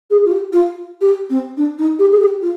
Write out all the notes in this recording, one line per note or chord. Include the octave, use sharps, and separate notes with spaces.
G#4
F4
G4
F4
G4
C4
D4
D#4
G4
G#4
G4
F4